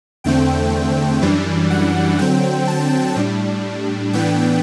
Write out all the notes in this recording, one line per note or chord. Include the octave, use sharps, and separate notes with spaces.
E2 D3 A3 C4 G5
F#2 E3 G3 D4
F#5
D3 F#3 C4 G5
A5
A2 G3 D4
A2 E3 B3 D4 G5